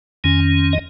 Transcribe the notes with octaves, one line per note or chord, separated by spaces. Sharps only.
F2 D#3 C#4 G#5
D#5